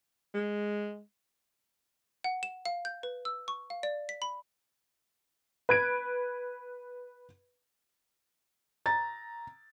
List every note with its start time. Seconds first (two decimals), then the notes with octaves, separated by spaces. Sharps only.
0.34 G#3
2.24 F#5
2.43 E7
2.65 F5
2.85 G6
3.03 B4
3.25 E6
3.48 C#6
3.70 F5
3.83 D5
4.09 B6
4.22 B5
5.69 B4 G#6 D7
8.86 A#5 A6